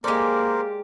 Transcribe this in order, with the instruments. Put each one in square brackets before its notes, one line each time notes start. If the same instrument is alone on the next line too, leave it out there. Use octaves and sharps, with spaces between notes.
[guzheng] G#3 A4 [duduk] A#3 [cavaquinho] G4 D5 [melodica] A#4 C5